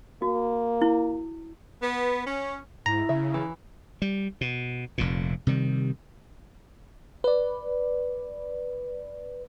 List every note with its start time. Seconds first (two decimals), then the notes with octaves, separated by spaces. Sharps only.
0.22 A#3 F#4
0.82 E4
1.82 B3
2.27 C#4
2.86 G#2 E4 A#5
3.09 C#3 E5
3.34 E3
4.02 G3
4.41 B2
4.98 F1 F2 A#2
5.47 C3 D#3 G3
7.24 B4 D5